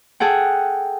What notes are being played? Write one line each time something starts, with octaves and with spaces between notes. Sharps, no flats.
G#4 A4 F#5 G5